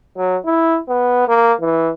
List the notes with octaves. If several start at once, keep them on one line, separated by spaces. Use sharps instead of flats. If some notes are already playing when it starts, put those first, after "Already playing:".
F#3
E4
B3
A#3
E3